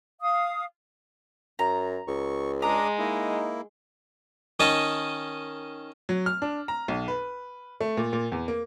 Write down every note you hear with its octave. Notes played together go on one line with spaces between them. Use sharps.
F5 D#6
F#2 A#5
C#2 C#6
G#3 D4 A#5 D6 D#6
A#3 D#4 E4
D#3 C#4 D#5 A5
F#3
F6
D4
A#5
B1
B4
A3
A#2
A#2
E2
A#3